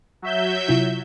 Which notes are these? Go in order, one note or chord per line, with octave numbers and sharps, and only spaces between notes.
F#3 E5 G6
C3 E4 F4